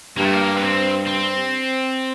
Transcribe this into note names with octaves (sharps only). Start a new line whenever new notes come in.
G2 A#3
A3
A#3
B3
C4
C4